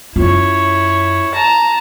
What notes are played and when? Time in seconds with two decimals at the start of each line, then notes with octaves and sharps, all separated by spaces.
0.16 F#2 E4 F4 C#5
1.34 A5 A#5